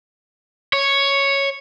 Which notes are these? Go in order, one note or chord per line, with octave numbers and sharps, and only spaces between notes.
C#5